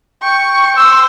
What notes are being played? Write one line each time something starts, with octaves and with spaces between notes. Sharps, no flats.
G5 C#6
C5 E6